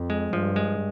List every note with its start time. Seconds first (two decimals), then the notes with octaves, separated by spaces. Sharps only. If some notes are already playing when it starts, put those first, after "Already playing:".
Already playing: F2
0.10 G#3
0.33 G2 F3
0.56 G#3